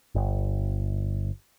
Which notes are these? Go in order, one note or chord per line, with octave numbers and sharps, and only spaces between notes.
G1